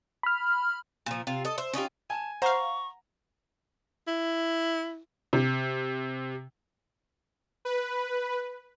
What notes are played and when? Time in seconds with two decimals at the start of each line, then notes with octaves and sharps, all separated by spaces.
0.23 B5 F6
1.06 A#2 F3
1.27 C3 F4
1.45 A4 D#5
1.58 C5 E5
1.73 C#4 D#4 F4 G4
2.10 G#5 A5
2.42 C5 F5 F#5 A#5 C#6
4.08 E4
5.33 C3
7.65 B4